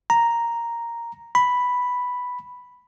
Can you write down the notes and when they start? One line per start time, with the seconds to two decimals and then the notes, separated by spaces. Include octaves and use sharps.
0.10 A#5
1.35 B5